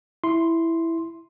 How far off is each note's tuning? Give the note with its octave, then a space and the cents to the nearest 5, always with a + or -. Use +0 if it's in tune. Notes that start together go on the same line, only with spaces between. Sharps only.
E4 +0 C6 +0